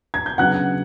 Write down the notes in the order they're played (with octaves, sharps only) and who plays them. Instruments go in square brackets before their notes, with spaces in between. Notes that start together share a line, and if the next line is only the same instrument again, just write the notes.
[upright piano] G#6
G6
C#3 F#3 B3 D4 F#5 F#6